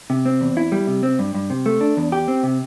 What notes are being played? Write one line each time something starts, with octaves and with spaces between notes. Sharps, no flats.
C3
C4
E2
E4
G3
C3
C4
G2
G2
C3
A3
D4
E2
G4
C4
C3